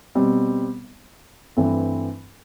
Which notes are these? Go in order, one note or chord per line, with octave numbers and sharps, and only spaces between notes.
B2 G3 C4
G2 E3 A3 C4